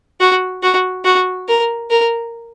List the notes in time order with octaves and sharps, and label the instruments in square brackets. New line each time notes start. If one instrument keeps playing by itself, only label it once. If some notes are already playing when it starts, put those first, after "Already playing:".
[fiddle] F#4
F#4
F#4
A#4
A#4